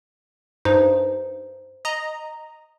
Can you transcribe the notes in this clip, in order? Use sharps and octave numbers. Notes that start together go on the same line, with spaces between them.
G2 D#4 C5
D#5 A#5